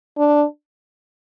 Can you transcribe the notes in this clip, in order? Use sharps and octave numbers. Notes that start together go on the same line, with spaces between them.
D4